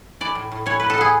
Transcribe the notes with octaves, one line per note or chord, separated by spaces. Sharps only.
E3 D5
A2
A2
E3 C#5
A2 B4
A4
B3 G#4